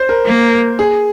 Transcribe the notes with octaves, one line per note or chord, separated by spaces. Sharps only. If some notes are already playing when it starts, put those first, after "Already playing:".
Already playing: C5
A#4
A#3
G#4